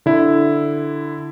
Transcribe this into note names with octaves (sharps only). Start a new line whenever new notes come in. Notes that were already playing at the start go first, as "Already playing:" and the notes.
D3 E4